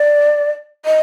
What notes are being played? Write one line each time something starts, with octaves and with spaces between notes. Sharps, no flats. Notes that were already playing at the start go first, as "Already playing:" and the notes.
Already playing: D5
D#5